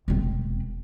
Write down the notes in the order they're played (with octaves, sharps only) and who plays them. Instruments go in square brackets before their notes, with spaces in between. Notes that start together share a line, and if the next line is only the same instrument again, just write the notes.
[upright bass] E1 C4